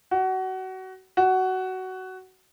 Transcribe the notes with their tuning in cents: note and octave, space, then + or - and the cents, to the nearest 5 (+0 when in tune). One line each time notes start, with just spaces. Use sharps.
F#4 +25
F#4 +15